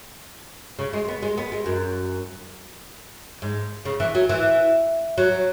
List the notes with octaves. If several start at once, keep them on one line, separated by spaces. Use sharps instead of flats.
C#3
G#3
B3
G#3
B3
G#3
F#2
G#2
C#3
E3
F#3
E3
F#3